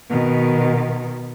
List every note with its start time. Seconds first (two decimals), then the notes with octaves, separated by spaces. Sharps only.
0.10 B2 D#3